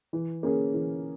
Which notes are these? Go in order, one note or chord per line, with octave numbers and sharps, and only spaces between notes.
E3
A#3 C#4 G#4
E3